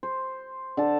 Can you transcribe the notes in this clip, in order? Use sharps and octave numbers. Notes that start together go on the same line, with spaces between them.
C5
D3 A5